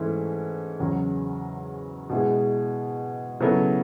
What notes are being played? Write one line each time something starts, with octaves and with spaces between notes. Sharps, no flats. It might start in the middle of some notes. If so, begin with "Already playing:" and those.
Already playing: G#2 E3 A3 C#4 E4
E2 C#3 F#3 C#4
B2 G#3 B3 E4 G#4
C#3 F#3 B3 E4 A4